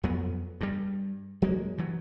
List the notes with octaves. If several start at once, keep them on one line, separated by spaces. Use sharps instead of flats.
F2 F#3 B3
G2 G3
F#3 G#3 A#3
G2 E3 F#3